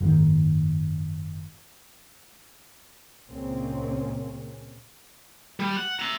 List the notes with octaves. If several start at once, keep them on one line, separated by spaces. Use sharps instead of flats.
F#1 G#2 D#3
C#2 A#2 C#3 A#3 C4 C#4
G3
F#5
E5 A#5